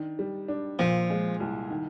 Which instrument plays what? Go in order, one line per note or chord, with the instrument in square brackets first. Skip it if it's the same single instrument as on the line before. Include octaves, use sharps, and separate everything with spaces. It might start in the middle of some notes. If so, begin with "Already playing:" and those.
Already playing: [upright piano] D#3 D4
G3
D4
[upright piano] A#2 [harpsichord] F3
[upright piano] G#3
C2
D#3